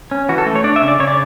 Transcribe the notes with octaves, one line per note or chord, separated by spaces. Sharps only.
C#4
E3 F#4
A4
A3
C#5
D4 D5
E5
C#3
D5
C#3 C#5
D5